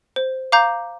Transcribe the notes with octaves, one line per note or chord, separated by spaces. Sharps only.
C5
F5 A#5 D6 G6